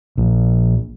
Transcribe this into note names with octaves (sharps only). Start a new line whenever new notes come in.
A#1